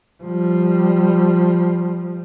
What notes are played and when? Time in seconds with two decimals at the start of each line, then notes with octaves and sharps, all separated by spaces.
0.23 F3 G3